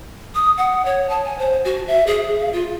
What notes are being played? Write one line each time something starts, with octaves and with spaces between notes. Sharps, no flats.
D#6
F#5
C#5
A5
G#5
C5
F#4
E5
G#4
F5
F4